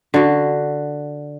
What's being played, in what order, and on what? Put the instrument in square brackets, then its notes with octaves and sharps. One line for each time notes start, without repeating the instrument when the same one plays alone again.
[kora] D3 F#4